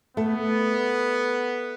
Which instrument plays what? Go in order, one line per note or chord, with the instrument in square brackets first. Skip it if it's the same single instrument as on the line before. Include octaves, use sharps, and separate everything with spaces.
[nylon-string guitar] A3 [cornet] B3